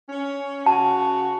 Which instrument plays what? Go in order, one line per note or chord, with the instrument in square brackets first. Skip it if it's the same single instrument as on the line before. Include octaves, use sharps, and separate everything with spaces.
[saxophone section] C#4
[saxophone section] C#3 F#4 [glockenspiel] A5